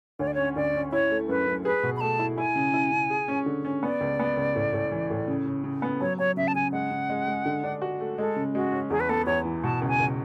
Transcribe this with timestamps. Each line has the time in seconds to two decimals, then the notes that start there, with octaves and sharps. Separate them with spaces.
0.19 D2 C#5
0.27 D5
0.34 C#4 C#5
0.56 D2 D5
0.74 C#4
0.92 E4 C#5
1.10 A3
1.29 F#2 B4
1.47 F#2
1.65 G#4 B4
1.83 B2
1.96 B5
2.01 A3 A5
2.19 E4
2.37 E4 G#5
2.56 C#3
2.74 E4
2.92 C#3
3.10 G#4
3.28 C#4
3.46 D3
3.65 C#4
3.83 B3 D5
4.01 C#2
4.20 B3
4.37 C#2
4.55 A2
4.73 A2
4.92 E3
5.10 A2
5.28 C#3
5.46 C#3
5.64 C#3
5.82 B3
6.01 F#3 C#5
6.19 F#3 C#5
6.37 C#3 E5
6.48 A5
6.55 C#3 G#5
6.72 G#3 F#5
6.91 C#3
7.09 G#3
7.28 G#3
7.45 D3
7.64 D4
7.82 F#4
8.00 A3
8.18 G#3 A4
8.36 C#3
8.54 G#3 F#4
8.72 C#4
8.90 E2 G#4
9.00 B4
9.09 B3 A4
9.26 E2 C#5
9.45 E3
9.63 B2 A5
9.82 C#2
9.88 G#5
10.00 C#2